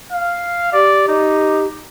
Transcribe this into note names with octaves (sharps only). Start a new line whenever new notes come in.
F5
G4 D5
D#4